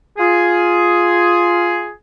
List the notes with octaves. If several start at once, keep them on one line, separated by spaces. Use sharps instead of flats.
F4 G#4